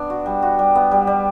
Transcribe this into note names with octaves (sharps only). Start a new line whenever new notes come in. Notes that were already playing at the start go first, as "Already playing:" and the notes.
Already playing: B3 D4
F#4
G3
F#4
G3
B3
G3
G3